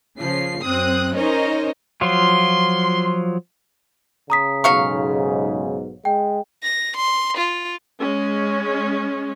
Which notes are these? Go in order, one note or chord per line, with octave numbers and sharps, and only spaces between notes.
C#3 F3 C7
F#2 C4 D#6 F#6
C#4 D#4 A#4 C5 C#5 D#5
F3 F#3 F4 C6
C#3 A#5 D#6 B6
B1 G#2 F#3 F5 C#6
G#3 G5
A#6
C6
F4
G#3 C#4